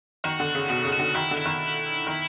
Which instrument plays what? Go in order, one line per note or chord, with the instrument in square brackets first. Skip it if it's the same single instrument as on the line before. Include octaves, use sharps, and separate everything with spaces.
[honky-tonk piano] D#3 [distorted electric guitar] F#4
[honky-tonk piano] D3
C#3
[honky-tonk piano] B2 [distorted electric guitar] F#4
[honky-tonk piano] C#3
[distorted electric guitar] F#4
[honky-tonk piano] D3
[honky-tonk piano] D#3 [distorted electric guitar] E4
[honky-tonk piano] D3
[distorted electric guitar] E4
[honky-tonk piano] D#3
D#3